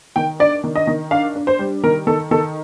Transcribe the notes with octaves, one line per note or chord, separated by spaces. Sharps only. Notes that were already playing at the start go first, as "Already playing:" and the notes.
D#3 G5
D4 D5
D#3
D#5
D#3
D4 F5
D4
C5
G3
D#3 A#4
D#3 A4
D#3 A4